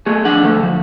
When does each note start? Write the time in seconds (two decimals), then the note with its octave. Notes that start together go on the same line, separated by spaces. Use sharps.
0.06 A3 G#4
0.25 F3 D4 F#5
0.44 D2 D3 A3
0.63 F3